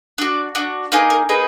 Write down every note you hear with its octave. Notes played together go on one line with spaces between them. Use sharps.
D4 F#4 D5
D4 F#4
A#3 D#4 G#4 B4
A#4
A#3 D#4 G#4 B4